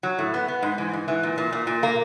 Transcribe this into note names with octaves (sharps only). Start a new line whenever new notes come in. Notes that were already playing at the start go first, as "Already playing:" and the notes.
F#3
A2
B3
B3
G#2
E3
G#2
E3
A#2
A#2
A#2
A#2
A#3